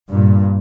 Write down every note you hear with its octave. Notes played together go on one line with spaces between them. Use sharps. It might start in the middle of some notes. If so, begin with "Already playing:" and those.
G2 A#2